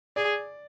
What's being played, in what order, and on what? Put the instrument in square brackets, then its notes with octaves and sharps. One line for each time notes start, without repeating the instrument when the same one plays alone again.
[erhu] G#4 [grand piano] D5